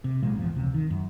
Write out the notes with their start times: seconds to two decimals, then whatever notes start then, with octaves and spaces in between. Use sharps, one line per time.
0.04 C3
0.22 B1 A#2 F3 G#3
0.36 G1 E2 F3
0.55 C#2 C3
0.74 D#3
0.90 F#2